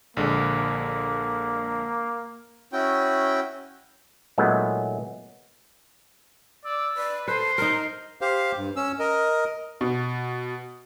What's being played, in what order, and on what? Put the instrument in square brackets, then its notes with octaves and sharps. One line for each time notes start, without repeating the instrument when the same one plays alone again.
[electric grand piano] A#1 D3 G#3 [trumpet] A#3
[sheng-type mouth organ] C#4 E4 F#4 G5
[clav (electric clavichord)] A#2 F#3 G#3 A3 B3 D#4
[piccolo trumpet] D5 [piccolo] E6
[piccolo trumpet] B4 [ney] D5
[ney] A4 [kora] B4 [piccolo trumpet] C5 [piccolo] C7
[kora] D#4 A#4 [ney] A#5
[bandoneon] G4 C5 F5
G2
C#4 E6
A#4 D#5
[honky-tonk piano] B2